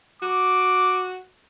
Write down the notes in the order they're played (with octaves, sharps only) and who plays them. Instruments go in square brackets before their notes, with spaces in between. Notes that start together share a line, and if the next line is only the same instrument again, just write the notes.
[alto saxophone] F#4 [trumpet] D6